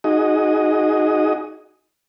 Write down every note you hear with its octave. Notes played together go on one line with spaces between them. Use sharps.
D#4 F#4 G#4 D#5